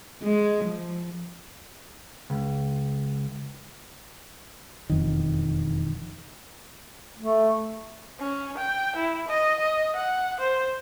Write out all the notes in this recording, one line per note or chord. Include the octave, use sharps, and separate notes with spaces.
G#3
F3
C#2
E1 F2 D#3
A3
C#4
G5
E4
D#5
D#5
F#5
C5